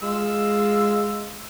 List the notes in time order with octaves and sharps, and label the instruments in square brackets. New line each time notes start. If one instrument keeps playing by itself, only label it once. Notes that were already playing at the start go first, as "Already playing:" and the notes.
[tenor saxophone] G#3 [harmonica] F4 E6